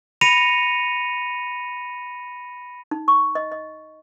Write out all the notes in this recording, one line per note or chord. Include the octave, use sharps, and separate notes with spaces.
B5 A#6 C#7 D#7 F7
D#4
C#6
D#5
D#5